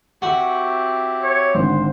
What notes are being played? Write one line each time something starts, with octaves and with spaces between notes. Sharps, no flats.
C4 E4 F#4 G4
C#5
G#1 D3 C5